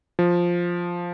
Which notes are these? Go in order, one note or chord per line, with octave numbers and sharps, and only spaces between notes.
F3